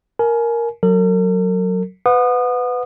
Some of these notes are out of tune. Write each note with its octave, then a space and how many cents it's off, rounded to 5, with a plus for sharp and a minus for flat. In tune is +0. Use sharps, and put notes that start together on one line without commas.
A#4 +0 G#5 +30
F#3 +0 A#4 -45
B4 +20 F#5 -30 D#6 -30